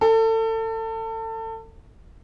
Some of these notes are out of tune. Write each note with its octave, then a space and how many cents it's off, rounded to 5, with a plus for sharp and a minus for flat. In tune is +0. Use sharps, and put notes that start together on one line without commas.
A4 +30